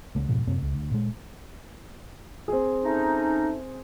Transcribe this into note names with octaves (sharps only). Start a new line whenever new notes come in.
C#2 A#3
F1 G#2 B2 F3
F#2 C3 A#3 C4
C#2
D2
A#2 G#3
C4 G#4
A3 C#4 D#4